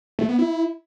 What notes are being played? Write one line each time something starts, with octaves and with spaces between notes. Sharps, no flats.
A3
B3
E4